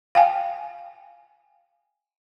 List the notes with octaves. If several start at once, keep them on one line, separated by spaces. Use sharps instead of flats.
F5 G5 G#5